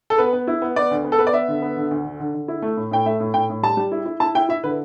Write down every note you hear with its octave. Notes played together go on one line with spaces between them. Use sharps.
A4
B3 B4
B3
E4
B3
B3 D5
D2
B3
A4
B3 B4
D5
B3 E5
D3
B3
D3
D2
D3
D3
D3
E4
A3
A2
A2 G5
A3 E5
A2
A2 G5
A2
G3 A5
G3
E4
E4
E4 A5
E4 G5
E4 E5
D3 B4